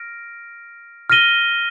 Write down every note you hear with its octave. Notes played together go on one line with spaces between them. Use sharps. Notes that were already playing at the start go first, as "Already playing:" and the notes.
Already playing: F6 A#6 D7
F6 A#6 D#7 G7